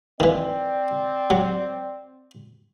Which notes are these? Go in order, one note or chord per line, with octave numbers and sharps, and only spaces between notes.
D#3 E3 C4 D5
F#3